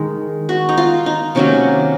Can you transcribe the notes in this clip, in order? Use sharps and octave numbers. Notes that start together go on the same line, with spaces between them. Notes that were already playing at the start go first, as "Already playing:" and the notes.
Already playing: D#3 G#3
F#4
D#4
F4
D#4
C3 D#3 F#3 A#3 C#4